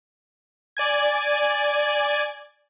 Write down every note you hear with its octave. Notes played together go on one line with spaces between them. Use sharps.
D5 G#5 G#6